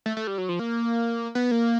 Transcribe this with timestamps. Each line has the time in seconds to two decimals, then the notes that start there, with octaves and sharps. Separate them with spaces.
0.06 A3
0.17 A3
0.27 G3
0.38 F#3
0.49 F3
0.59 A#3
1.35 B3
1.51 A#3